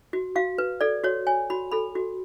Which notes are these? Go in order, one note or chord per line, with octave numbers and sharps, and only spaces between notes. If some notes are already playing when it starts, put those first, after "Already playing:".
F#4
F#4 F5
B4
A4 D5
F#4 C#5
C#5 G#5
F#4 B5
A4 B5
F#4